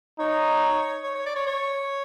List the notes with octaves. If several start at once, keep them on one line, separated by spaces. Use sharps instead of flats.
D#4 C#5
C#5
C#5
D5
C#5
C#5